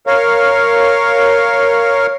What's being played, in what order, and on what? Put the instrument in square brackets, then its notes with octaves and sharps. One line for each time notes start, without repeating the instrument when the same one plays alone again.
[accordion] A#4 C#5 F5